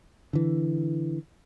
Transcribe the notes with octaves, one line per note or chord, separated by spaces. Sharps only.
D3 E3